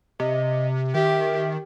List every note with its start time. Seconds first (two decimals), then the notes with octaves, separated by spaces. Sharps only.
0.20 C3 D#5
0.94 D#3 G4 E5